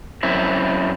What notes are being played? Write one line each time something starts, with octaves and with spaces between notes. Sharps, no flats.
F#2 C4 E4